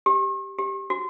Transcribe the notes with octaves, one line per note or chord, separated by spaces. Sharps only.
G4
G4
F#4